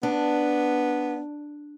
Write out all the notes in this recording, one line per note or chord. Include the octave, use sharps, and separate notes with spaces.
B3 D4